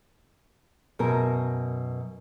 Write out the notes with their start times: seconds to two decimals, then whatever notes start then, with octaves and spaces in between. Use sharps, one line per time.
0.99 F#2 B2 A#4 A5